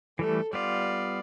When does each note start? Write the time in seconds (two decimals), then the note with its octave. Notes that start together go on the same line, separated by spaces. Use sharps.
0.19 E3 G3 A3 A4
0.53 G3 B3 F4 D5